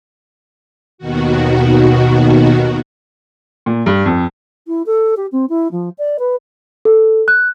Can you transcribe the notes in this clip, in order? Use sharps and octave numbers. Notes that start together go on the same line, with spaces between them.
D#2 B2 D#3 F#4
A#2
G2
F2
E4
A4
G4
C4
E4
F3
D5
B4
A4
F#6